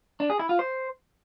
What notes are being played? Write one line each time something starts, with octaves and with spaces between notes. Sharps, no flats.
D4
G#4
E4
F4
C5